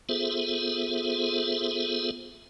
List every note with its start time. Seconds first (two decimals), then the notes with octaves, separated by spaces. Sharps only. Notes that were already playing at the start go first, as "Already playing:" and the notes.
0.09 B3 F4 G#4 A4 C5 E5